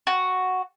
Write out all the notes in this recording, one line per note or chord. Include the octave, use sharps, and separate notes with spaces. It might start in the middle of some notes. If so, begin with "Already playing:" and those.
F#4